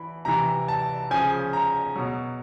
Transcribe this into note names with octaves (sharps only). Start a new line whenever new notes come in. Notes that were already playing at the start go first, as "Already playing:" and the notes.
Already playing: E3 B5
C3 E3 A#5
A5
C#3 F3 G#5
A#5
B2 F#3